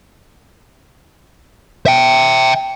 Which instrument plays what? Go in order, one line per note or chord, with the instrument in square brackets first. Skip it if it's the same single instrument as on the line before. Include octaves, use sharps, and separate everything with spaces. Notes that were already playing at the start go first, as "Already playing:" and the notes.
[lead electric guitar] E5 G5